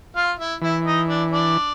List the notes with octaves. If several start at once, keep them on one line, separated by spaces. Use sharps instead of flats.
F4 F5
E4 E5
E3 E4 E5
D#4 D#5
D4 D5
D4 D5